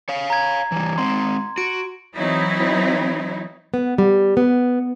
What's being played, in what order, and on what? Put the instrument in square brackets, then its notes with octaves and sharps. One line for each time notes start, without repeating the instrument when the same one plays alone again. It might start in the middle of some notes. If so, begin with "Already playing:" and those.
[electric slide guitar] C#5 F5
[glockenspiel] A#5 G#6
[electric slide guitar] E3 G3
[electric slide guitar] G#3 C4 [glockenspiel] C6
[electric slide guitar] F#4 [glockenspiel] D7
[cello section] E3 F#3 C4 D#4 E4
[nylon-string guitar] B3
G3
B3